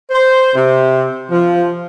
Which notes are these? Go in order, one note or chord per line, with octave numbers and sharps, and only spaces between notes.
C5
C3
F3